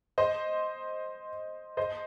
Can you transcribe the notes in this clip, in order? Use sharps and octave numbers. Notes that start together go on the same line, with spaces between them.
C5 D#5
C5 D#5